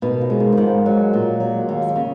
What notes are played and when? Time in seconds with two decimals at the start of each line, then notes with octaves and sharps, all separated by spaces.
0.02 B2 D#3
0.21 F3
0.30 G#3
0.40 D#3
0.52 D#3
0.57 G#2 F3
0.86 F#3 G#3
1.14 A#2
1.40 F#3
1.69 D#2
1.96 C#3